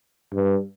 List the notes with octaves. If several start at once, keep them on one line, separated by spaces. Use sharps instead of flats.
G2